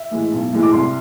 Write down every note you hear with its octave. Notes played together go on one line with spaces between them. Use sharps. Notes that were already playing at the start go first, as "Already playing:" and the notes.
Already playing: E5
A2 E3 G#3
B1
A2 E3 G#3
D6
C2 C6